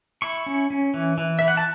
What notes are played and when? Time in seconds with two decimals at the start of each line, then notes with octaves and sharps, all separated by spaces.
0.22 E4 C#6
0.46 C#4
0.70 C#4
0.94 E3
1.18 E3
1.39 E3 E5
1.48 F#5
1.57 A5